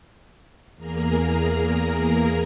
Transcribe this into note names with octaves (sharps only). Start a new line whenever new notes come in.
E2 A#3 G#4 A#4 A#5